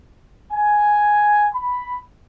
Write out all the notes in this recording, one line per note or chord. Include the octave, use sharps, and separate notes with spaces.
G#5
B5